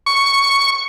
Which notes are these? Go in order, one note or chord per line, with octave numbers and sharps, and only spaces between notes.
C#6